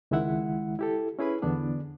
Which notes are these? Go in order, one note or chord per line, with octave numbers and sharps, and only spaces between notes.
C#2 D#3 G#3 E4 E5 F#5
E4 G4 A4
C#4 E4 G#4 B4 B5
E2 D3 B3 D4 D5